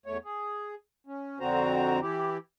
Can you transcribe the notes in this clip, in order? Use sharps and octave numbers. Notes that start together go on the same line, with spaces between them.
E2 A3 C#5
G#4
C#4
F2 D3 C4 F#4 C5 A#5
E3 E4 G4